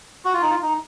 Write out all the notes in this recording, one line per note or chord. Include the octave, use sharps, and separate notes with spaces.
F#4
F4
D#4
F4
D#4